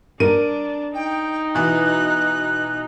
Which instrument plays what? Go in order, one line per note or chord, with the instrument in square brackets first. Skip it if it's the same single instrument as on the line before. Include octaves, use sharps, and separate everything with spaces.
[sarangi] D4 [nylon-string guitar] A#4 [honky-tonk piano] D#7
[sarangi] D#4 [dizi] G5
[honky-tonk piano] B2 E3 [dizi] F#6